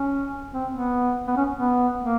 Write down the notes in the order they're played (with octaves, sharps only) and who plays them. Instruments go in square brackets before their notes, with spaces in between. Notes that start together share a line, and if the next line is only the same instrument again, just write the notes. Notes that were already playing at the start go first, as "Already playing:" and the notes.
Already playing: [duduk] C#4
C4
B3
B3
C#4
B3
A#3